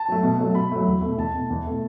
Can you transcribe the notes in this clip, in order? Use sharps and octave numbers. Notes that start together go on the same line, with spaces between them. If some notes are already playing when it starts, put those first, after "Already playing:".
Already playing: A5
F#3 A3
B2
F#3 A3
B2 B5
F#3 A3
E2
B2 A3
E2 A5
B2 A3
E2
B2 A3